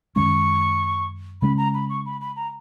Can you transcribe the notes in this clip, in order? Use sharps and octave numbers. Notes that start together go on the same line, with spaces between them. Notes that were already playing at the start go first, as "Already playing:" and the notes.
F#2 D#3 G#3 C#4 C#6
C#3 G#3 C#4 B5
A#5
B5
C#6
B5
B5
A#5